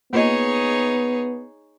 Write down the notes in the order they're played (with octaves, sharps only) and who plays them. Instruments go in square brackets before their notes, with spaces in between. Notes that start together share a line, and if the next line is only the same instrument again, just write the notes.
[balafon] A#3 F4 D#5 [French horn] B3 [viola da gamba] D#4 G#4 C#5